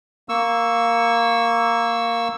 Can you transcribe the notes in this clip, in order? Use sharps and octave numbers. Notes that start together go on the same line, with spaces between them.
A#3 C#6 E6